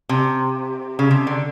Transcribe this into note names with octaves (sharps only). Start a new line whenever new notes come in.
C3
C#3
C3
D3